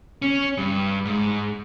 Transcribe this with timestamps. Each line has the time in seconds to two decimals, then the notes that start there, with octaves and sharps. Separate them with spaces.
0.22 C#4
0.57 G2
1.05 G#2